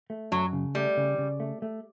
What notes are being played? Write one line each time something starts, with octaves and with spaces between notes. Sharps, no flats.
A3
F#2 F#3
C#3
G3 A3
C#3
C#3
A3
A3